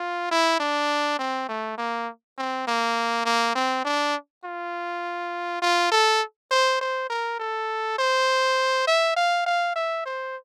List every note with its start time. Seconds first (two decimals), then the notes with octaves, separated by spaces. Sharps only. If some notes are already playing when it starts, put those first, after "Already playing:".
Already playing: F4
0.31 E4
0.59 D4
1.19 C4
1.49 A3
1.78 A#3
2.38 C4
2.67 A#3
3.26 A#3
3.55 C4
3.85 D4
4.44 F4
5.62 F4
5.92 A4
6.51 C5
6.81 C5
7.10 A#4
7.40 A4
7.99 C5
8.87 E5
9.16 F5
9.46 F5
9.76 E5
10.06 C5